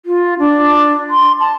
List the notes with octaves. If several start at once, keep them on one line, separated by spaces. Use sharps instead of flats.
F4
D4
C6
A5